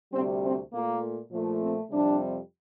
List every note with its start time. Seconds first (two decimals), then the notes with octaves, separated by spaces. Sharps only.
0.12 D2 C3 G3 C4
0.43 C4
0.72 A#2 A3 A#3
1.32 A#2 F3 A3
1.61 C4
1.90 F2 C3 G3 D4